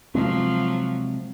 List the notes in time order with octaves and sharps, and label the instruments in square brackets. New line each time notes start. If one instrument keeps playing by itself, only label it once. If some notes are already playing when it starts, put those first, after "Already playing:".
[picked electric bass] C3 G#3 C4 [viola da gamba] F3 F#3